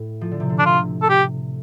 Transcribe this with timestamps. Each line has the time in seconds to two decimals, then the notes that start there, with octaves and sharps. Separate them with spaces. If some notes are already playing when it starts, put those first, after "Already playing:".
Already playing: A2
0.21 F3
0.31 D3
0.40 C3
0.49 D3
0.59 D4
0.66 C3 F4
1.02 A4
1.10 G4